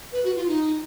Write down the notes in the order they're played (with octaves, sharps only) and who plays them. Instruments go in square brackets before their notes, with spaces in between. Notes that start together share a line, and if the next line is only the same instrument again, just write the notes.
[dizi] B4
F#4
F4
D#4